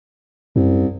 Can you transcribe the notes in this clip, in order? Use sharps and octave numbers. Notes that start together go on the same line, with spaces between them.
C2 F#2